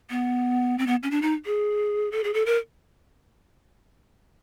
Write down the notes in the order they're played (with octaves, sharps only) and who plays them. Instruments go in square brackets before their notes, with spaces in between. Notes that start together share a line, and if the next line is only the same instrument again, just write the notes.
[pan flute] B3
C4
B3
C#4
D4
D#4
G#4
A4
G#4
A4
A#4